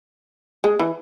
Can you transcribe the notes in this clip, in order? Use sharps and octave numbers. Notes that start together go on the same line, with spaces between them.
G#3
E3